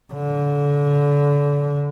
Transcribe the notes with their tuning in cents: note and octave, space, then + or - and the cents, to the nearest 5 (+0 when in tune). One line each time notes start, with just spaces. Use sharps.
D3 -30